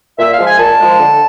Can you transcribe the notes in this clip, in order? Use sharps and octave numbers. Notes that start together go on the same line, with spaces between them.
A#2 E5
F5
F3 G#3
G#5
A#2 A5
F3 G#3
D3